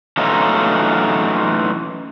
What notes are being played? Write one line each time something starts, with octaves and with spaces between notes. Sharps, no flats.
E3 F#3 A3 C#4 D#4 F4